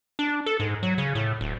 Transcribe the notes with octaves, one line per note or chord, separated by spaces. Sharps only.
D4
A4
G#2
F#3
C#3
A2
D1